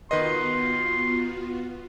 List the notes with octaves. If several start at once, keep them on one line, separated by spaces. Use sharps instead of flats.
D#3 B3 F4 F#4 B4 D#5 C6